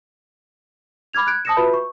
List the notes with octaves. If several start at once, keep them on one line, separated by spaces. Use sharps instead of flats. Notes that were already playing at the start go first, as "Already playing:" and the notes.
B5 D6 F6 G#6 F7
F#6 G#6 D7
A5 D#6 E6 A#6 C#7 E7
F4 F#4 B4 E5 B5 G6
C#6